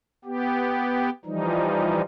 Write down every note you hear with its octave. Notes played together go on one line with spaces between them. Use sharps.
B3 G4
E3 F3 G3 D#4